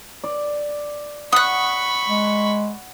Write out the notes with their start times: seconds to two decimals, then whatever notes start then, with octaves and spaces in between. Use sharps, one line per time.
0.24 D5
1.32 F#5 B5 C#6 D#6 F#6
2.08 G#3